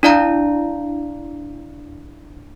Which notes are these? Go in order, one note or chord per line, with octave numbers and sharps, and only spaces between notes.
D4 E4 D5 F5 A#5